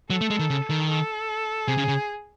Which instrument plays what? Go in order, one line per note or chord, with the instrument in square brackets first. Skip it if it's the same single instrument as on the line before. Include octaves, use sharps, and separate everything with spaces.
[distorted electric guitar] F#3 [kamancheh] A4
[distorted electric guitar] A3
G#3
D#3
C#3
D#3
[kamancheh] A4
[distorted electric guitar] C3 [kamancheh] G#4
[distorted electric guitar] C#3
C#3